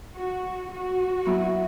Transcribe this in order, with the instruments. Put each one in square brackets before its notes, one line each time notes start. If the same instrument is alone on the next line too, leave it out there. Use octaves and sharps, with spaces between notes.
[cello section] F#4
F#4
[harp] F#3 B3 E4